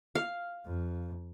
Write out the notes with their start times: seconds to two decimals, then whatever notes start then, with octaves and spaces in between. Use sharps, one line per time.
0.15 F5
0.66 F2